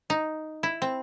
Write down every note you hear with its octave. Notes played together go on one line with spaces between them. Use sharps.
D#4
E4
C4